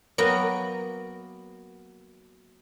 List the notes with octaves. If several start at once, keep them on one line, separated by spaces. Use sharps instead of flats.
F#3 A#3 B3 G5